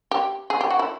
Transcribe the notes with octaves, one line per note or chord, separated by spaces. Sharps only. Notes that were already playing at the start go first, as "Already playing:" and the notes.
G4
G#4
G4
F#4
E4